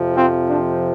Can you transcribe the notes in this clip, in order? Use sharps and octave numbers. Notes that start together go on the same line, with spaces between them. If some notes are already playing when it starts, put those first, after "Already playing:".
Already playing: F2 C3 F3
C4 F4
D4